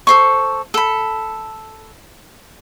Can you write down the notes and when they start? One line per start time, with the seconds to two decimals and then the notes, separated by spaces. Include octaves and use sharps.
0.07 A4 C5 C#6
0.74 A4 B5